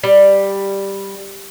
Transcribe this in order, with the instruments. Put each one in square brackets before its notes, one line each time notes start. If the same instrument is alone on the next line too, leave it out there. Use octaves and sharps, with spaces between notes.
[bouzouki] G3